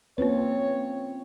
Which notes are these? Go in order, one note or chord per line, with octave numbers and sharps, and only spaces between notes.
A#3 C4 C#4 F4 B4 C#5